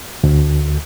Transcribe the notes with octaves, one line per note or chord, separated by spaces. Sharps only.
D2